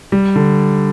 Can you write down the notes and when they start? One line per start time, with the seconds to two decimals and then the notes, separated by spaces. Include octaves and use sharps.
0.12 G3
0.36 D3